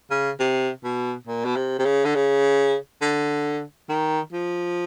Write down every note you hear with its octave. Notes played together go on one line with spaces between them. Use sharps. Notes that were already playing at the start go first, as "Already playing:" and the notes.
C#3
C3
B2
A#2
B2
C3
C3
C#3
D3
C#3
D3
D#3
F3